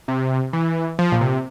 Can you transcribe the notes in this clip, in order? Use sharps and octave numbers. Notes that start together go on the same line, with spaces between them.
C3
E3
F3
A#2
C3